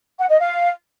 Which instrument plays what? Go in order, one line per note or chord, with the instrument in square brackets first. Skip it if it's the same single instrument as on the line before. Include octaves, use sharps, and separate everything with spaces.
[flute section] F#5
D#5
F5